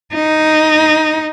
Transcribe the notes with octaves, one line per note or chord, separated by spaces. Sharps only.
D#4